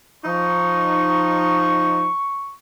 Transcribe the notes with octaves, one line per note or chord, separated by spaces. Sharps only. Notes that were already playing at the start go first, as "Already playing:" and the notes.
F3 D#4 C#6